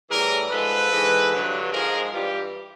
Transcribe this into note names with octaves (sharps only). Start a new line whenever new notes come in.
A2 E3 G3 G#4 A#4
G#2 F3 G#3 A4 B4
G#2 E3 G#3
G2 D3 F#3
G#2 F3 G#3 G#4 A#4
G2 E3 G3 F4 G4